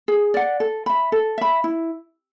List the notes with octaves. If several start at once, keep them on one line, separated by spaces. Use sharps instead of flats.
G#4
D5 F#5
A4
E5 B5
A4
E5 B5
E4